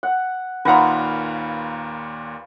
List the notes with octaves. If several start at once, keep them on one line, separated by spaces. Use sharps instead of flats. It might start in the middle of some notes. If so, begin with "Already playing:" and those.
F#5
D#2 A#2 D#4 B4 F5 F#5 A#5 C6